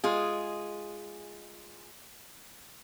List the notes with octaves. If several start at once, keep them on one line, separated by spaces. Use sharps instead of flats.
G#3 F4 G#4